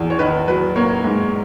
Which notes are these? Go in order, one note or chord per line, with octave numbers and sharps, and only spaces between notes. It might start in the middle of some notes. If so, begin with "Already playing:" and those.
Already playing: E2
C#5
D#3 B4
F#3 B4
A#3 C#5
G#2